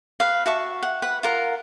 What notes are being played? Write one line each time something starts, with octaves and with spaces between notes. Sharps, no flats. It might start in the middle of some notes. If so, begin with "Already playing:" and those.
B4 F5
F#4 E5 A5 C#6
F#5
B4 F#5 B5
F4 A#4 F#5